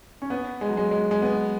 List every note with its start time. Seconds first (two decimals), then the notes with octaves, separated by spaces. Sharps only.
0.22 C#4
0.30 B3
0.61 G#3
0.69 F#3
0.77 G#3
0.91 G#3
1.11 G#3
1.22 B3